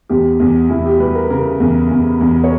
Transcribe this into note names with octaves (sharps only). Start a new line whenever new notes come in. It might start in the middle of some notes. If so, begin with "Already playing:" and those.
E2 G4
E2
E2 E4
G4
G3 B4
A#4
C#3 A#4
E2
E2
E2
C#5